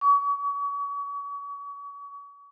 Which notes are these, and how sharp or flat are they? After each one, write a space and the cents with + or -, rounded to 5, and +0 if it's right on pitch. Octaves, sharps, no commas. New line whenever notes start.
C#6 +40